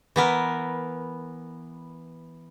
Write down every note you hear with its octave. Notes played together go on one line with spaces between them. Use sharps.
E3 B3 A#4